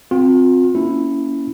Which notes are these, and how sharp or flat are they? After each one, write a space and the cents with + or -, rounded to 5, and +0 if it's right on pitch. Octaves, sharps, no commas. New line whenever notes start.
C4 +0 F4 +40
A#3 +15 C#4 +20 E4 +0